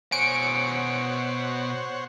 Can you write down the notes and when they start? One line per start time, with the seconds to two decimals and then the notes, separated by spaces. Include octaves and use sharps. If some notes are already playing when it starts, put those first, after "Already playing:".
0.12 B2 C5 C#5 F#5 G#5 C#7 D7